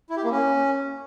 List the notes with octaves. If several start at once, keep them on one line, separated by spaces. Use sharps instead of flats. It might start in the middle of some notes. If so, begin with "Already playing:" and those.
E4
G4
A#3
C#4